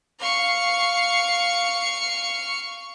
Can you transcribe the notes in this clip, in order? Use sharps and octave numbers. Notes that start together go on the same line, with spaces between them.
F5 C#6